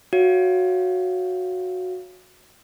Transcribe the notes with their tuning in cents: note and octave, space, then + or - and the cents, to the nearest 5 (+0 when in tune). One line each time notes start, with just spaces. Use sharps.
F#4 -10 C#5 +0 F5 -25